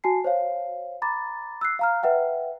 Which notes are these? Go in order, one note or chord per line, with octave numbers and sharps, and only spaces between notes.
F#4 G#5 A5 C7
C5 C#5 F5
A#5 B5 D6 A6
E6 F#6 C7
F5 A#5 F6
B4 E5 F#5 G5